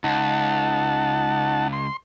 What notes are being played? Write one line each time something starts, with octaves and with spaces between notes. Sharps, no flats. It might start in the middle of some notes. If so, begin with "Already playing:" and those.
C#2 D#4 F#5 A5
C6